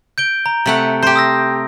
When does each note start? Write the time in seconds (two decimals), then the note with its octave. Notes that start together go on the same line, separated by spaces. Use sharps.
0.18 G6 D7 G7
0.46 A#5
0.66 C3 A3 F#5
1.02 G4 C5
1.16 D#6 E6 A#6